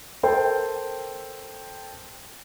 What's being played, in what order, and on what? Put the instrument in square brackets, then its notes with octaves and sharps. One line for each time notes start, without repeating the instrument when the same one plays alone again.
[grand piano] A4 A#4 C5 G5